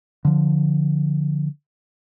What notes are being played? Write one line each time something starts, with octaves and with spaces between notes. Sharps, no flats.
D3 F3